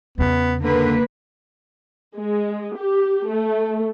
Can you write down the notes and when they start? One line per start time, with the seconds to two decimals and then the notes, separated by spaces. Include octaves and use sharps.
0.18 E2 C#3 B3
0.61 D3 A#3 B4
2.17 G#3
2.78 G4
3.29 A3